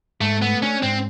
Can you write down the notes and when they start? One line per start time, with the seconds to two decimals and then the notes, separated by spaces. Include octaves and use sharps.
0.21 G#2 A3
0.42 A3 B3
0.62 C#4 D4
0.83 G#2 C4